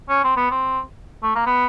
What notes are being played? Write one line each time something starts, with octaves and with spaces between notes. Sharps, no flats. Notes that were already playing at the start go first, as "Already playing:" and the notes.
C#4
C4
B3
C4
A3
A#3
B3